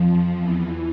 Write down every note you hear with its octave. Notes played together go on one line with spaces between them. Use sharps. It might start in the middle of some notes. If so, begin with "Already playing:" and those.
Already playing: F2 F3
E2 E3